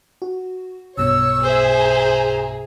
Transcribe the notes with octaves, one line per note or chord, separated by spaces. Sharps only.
F#4
B1 G2 B2 C#5 E6
G#4 C5 E5
A#5